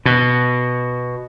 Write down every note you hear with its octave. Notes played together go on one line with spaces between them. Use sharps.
B2